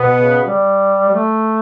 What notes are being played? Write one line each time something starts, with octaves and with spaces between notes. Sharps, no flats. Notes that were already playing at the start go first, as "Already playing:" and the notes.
Already playing: B2 B3
C#3
G3
G3
A3